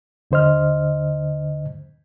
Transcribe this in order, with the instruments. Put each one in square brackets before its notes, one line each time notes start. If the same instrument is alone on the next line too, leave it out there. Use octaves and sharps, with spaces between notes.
[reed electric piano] D#2 D3 C5 D#5 F6